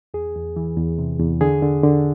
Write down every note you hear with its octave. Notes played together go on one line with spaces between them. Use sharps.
E2 G#4
E2
E3
E2
C3
E2
D3 G#4
D3
D3